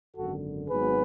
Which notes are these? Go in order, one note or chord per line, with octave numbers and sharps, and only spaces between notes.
G#1 F#2 D3 F#4 A4
G#1 G#2 F#3 B3 G#4 B4